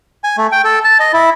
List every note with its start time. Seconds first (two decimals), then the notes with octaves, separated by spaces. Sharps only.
0.24 G#5
0.37 A3
0.52 G5
0.64 A4
0.84 A5
1.00 D#5
1.13 E4